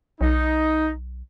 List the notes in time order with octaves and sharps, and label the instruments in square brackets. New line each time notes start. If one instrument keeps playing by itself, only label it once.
[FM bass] B1 [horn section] D#4